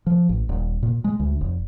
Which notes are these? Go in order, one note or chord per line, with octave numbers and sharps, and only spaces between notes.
F3
A1
D#1
A#2
G#3
D2
F1